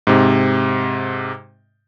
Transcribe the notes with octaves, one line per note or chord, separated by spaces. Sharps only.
G#2 C3